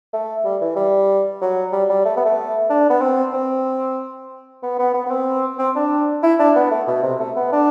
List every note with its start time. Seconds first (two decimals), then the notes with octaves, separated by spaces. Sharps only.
0.13 A3
0.45 G3
0.61 E3
0.76 G3
1.42 F#3
1.73 G3
1.90 G3
2.05 A3
2.16 B3
2.26 A3
2.70 D4
2.90 B3
3.01 C4
3.33 C4
4.63 B3
4.79 B3
4.94 B3
5.06 B3
5.11 C4
5.59 C4
5.75 D4
6.23 E4
6.39 D4
6.56 B3
6.71 A3
6.87 B2
7.03 C3
7.20 A3
7.36 B3
7.52 D4